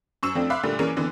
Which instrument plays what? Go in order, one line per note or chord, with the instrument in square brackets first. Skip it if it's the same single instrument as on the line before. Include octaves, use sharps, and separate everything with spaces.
[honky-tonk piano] F#2 C#6 E6 E7
F2 F3 A3 C4 D4
E5 F5 B5 C6 D6 F#6
A#2 D3 G3 A3
E3 A#3 C#4 G#4 A#4 D5
F2 D3 E3 B3